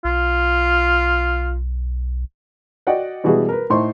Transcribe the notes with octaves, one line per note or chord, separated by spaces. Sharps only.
B1 F4
F#4 D5 D#5 F#5 G5
B2 E3 G3 G#3 F#4 G#4
A#4 B4
A2 D#4 C5 C6 C#6